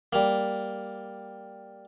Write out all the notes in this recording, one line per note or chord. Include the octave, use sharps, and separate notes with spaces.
G3 A#3